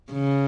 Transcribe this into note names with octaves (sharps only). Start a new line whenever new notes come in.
C#3